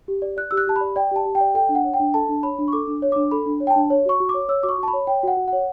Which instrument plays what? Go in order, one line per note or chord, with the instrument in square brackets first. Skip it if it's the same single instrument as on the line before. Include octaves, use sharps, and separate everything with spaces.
[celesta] G4
D5
D5 F#6
G4 E6
F#6
G4 A5
D5 B5
D5 G5
G4 A5
G4
G5
D5
A4 G5
D4
F#5
C#5
G5
D4
A4 A5
D4
C#5 B5
D4
C#6
A4 D6
D4
C#5
D4 D6
A4 B5
D4
C#5
G5
A5
D4
C#5
F#4 C#6
F#4
D6
C#5
C#5 E6
F#4 D6
C#6
F#4
A5
B5
C#5
C#5 G5
F#4 F#5
F#4
C#5 F#5